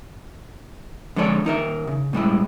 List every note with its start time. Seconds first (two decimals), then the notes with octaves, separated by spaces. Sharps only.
1.16 D3 F3 G#3 A4 C#5 D5
1.45 D#2 D#4 A#4 E5
1.87 C#3
2.13 A2 G3 G#3 E4